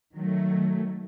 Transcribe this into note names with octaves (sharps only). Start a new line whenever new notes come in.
D#3 F#3 A3